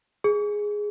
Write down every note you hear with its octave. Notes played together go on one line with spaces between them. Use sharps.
G#4